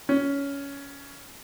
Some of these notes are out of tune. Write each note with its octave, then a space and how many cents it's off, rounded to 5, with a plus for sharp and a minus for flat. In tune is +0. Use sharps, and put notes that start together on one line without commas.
C#4 +15